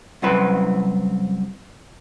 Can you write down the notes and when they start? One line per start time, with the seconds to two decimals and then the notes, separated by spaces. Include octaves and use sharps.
0.22 C2 F#2 C4 E4 B4